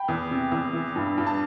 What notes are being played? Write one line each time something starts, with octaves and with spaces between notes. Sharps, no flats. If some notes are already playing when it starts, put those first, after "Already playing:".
Already playing: G5 B5
E2
C3
E2
E3
G2
G2
A5